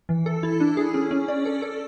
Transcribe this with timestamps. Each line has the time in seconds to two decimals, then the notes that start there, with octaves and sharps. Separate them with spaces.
0.09 E3
0.26 A4
0.43 E4
0.60 D4
0.77 G#4
0.94 C#4
1.11 C#4
1.28 D5
1.46 A4
1.62 A4